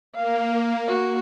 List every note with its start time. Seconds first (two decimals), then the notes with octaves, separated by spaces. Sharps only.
0.14 A#3 F5
0.87 F#4